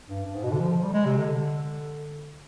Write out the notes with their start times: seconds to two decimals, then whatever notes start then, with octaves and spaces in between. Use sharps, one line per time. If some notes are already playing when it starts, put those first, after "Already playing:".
0.09 G2
0.26 G2
0.34 G#2
0.43 B2
0.51 D3
0.60 F3
0.83 G3
0.93 G#3
1.05 C3
1.17 D3